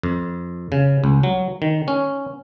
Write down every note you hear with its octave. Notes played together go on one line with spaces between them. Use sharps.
F2
C#3
C#2
F#3
D#3
C#4